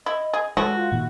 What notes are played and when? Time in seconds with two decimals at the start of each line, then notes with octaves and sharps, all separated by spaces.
0.06 E4 D#5
0.33 G#4
0.57 E3 G#3 F#4 A4 C#5
0.75 F4
0.92 A#2 D#3 E4